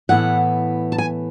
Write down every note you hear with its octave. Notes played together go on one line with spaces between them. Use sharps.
A2 E3 B3 E4 F#5
A5
G#5